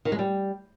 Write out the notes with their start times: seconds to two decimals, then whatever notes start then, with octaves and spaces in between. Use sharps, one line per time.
0.05 D#3
0.12 G#3
0.19 G3